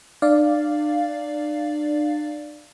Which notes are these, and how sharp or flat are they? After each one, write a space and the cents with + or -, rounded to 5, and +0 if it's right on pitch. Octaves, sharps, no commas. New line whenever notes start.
D4 +40 D5 -5 F5 -5